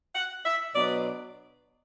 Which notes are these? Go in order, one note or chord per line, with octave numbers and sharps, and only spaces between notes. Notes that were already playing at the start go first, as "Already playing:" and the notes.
F#5
E5
B2 F#3 B3 D4 D5